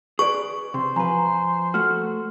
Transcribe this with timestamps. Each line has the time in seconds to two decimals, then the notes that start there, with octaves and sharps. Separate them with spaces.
0.19 G#4 B4 D5 C#6
0.74 C3 C5
0.96 F3 B4 G#5 A#5
1.74 A3 F#4 F6